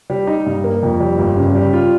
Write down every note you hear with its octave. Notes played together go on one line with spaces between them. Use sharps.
G3
D#4
G2
A#3
F2
G3
G1
C#3
G3
F4